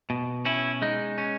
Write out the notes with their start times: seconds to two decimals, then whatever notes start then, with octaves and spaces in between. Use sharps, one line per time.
0.10 B2
0.45 C#4 E4
0.82 G#3 D#4
1.18 C#4